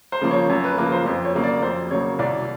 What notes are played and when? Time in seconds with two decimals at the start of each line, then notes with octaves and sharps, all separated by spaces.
0.12 C5
0.21 C#3 F3 A#3
0.31 C#5
0.50 F#2 C#5
0.64 B4
0.78 C#3 F3 A#3 B4
0.92 C5
1.06 F2 C5
1.25 C#5
1.35 C#3 F#3 A#3
1.44 D5
1.62 F2 C5
1.90 C#3 F#3 A#3 C#5
2.19 C2 D5